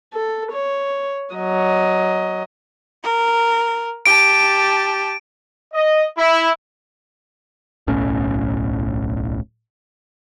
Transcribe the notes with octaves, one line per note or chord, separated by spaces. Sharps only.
A4
C#5
F#3 D#5
A#4
G4 A5 D7
D#5
E4
D1 B1 A2 C#4